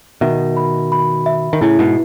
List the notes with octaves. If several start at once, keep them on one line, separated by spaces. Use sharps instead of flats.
B2 D#3 E5
B5
B5
E5
D#3
A2 C#3 E4
G#2 B2